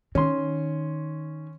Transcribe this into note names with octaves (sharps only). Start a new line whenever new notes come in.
D#3 C#4 C6